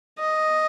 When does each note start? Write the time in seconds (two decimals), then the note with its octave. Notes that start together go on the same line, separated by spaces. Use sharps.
0.19 D#5